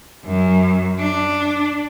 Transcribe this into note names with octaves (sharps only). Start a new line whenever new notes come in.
F#2
D4